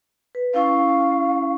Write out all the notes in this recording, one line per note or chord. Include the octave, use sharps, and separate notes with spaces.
B4
C#4 E4 F5 C#6